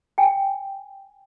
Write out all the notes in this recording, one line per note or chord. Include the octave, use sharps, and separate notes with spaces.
G5 G#5